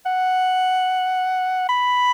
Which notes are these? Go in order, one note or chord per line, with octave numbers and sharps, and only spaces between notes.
F#5
B5